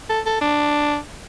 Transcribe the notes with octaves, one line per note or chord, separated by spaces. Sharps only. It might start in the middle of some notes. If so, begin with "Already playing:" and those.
A4
A4
D4